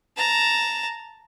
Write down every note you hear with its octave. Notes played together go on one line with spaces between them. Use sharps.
A5 A#5